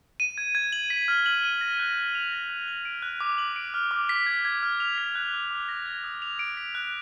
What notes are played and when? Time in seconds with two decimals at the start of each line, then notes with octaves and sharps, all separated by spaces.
0.20 D#7
0.38 G#6
0.55 G#6
0.72 F#7
0.90 B6
1.08 F6
1.26 F#7
1.44 D#7
1.61 A#6
1.79 F#6
1.97 F#6
2.15 F7
2.32 A#6
2.50 F#6
2.68 F#7
2.85 D7
3.02 F#6
3.20 D6
3.38 F#7
3.56 D7
3.74 F6
3.91 D6
4.09 B6
4.26 G#6
4.45 G#6
4.63 F6
4.80 F7
4.98 B6
5.15 F#6
5.34 D6
5.51 D6
5.69 A#6
5.86 G#6
6.04 D#6
6.22 F7
6.39 D7
6.57 B6
6.75 F#6